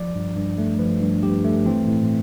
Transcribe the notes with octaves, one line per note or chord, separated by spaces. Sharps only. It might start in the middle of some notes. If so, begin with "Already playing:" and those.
Already playing: F3 D5
G2
G2
A3
F3 B4
G2
G2 G4
A3
E3 C4
A2